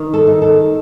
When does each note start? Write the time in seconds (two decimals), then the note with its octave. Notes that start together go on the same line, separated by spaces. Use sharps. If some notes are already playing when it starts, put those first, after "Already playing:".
Already playing: D#3
0.14 A4
0.27 D#4
0.42 A4